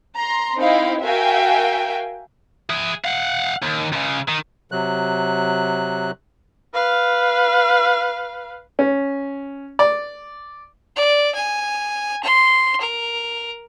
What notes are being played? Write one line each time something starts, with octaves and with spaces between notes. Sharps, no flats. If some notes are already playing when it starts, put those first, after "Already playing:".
A#5 C6
C4 D#4 E4 F5 G5
F#4 A#4 E5 F5 G5 G#5
G#4 E5
F5 F#5
D#2
C#2 C#3
D#3
C3 F#3 F#6
B4 F5
C#4
D5
D5
G#5
C6
A#4